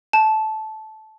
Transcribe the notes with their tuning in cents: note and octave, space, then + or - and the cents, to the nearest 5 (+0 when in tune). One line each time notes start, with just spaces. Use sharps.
A5 -15